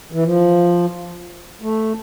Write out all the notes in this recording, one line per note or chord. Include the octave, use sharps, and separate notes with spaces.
E3
F3
A3